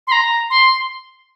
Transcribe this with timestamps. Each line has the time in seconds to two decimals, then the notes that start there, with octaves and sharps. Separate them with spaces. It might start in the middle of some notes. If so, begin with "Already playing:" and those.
0.07 C6
0.12 A#5
0.50 C6